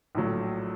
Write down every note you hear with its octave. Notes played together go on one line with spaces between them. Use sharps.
A#1 A2 F#3 A3